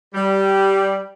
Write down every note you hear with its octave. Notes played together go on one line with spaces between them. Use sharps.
G3